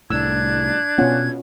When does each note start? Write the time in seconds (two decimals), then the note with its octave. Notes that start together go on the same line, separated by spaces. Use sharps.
0.10 C2 A2 D4 E6 F#6 G#6
0.98 B2 B3 C#4 F4 F#5